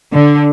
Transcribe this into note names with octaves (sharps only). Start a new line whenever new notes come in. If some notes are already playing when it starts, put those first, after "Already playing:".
D3